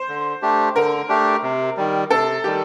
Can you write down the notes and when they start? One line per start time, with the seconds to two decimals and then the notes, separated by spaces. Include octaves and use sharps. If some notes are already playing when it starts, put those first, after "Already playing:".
Already playing: C5
0.08 D3
0.42 A3 D4 G4
0.75 D3 A#4
1.09 A3 D4 G4
1.43 C3
1.77 D#3 G3
2.10 C3 A4
2.44 D#3 G3 G4